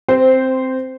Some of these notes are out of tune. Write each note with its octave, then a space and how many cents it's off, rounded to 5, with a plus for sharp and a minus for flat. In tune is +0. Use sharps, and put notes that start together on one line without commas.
C4 +0 C5 -10